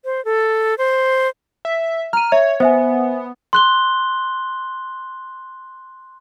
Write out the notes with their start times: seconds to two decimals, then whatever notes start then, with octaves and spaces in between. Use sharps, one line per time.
0.05 C5
0.25 A4
0.78 C5
1.65 E5
2.13 A#5 F6 D#7
2.32 C#5 E5
2.60 B3 C5 E5 G#5
3.53 C6 F#6 G7